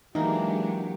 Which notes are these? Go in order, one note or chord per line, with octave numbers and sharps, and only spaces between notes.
E3 F#3 G#3 A#3 D4 D#4 G4